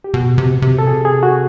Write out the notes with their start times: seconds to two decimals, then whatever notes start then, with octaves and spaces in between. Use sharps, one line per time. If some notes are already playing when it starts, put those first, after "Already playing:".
0.04 G4
0.14 B2 F#4
0.38 C3
0.62 C3
0.78 A4
0.87 G#4
1.05 G#4
1.23 F#4